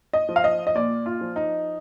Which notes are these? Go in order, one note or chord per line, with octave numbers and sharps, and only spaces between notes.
D#5
F3
F5
D#5
D#5
A#2 D5
F4
F3
D#4